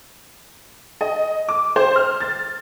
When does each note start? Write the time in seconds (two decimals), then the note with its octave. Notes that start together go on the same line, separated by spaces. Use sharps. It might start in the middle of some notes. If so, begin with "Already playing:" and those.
1.01 D#5
1.49 D6
1.76 C5
1.96 F6
2.20 A6